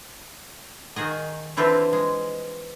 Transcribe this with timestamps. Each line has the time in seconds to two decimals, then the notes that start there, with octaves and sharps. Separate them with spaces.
0.96 D#3 F#4 G#4 D#5
1.57 D3 E3 C4 E4 F4
1.93 G#3